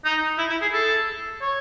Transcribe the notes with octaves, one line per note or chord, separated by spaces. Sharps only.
D#4
E4
E4
G#4
A4
C#5